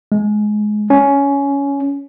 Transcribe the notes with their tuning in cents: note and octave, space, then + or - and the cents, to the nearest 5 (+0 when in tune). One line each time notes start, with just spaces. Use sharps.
G#3 +20
C#4 +15